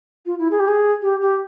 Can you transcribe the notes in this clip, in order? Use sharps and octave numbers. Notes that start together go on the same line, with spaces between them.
F4
E4
G#4
G4
G#4
G4
G4